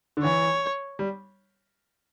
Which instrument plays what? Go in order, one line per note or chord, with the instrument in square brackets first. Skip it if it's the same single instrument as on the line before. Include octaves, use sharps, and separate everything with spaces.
[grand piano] D3
[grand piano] E3 [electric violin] C#5
[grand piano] G3